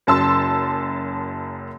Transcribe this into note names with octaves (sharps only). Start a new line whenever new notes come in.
F#1 F#2 A5 C6 E6